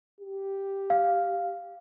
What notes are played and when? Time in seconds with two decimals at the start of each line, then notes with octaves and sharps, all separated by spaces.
0.21 G4
0.90 F5